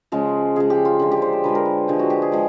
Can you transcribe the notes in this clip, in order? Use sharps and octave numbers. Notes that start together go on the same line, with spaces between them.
C#3 F3 G#3
C#3 F3 G#3 G#4
G4
F4
D3 F3 G#3
G4
C5
C5
D3 F3 G#3 B4
A#4
B4
D3 F3 G#3 G4
F#4
G4
G#4
F3 G#3